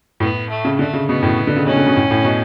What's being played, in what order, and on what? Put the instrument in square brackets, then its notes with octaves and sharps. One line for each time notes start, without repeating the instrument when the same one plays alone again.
[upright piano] A2 [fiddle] B3
[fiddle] A3
[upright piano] C#3
[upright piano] D3 [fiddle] A3
[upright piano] C#3
[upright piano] B2 [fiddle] B3
[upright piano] A2
D3
C#3
[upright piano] B2 [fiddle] C#4
[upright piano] D3
B2
A2
A2
B2